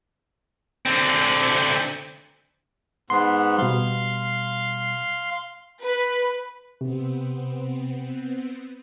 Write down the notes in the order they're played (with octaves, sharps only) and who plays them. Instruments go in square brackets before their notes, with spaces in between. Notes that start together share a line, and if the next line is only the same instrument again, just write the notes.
[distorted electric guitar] D3 C4
[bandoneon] G#2 B3 [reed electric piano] C6
[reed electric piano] B2 G3 [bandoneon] F5 C6
[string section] B4
[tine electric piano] C3 [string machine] B3 C4